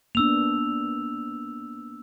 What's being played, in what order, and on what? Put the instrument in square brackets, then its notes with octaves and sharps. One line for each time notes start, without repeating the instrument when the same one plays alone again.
[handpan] A#3 B3 D4 [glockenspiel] E6 F7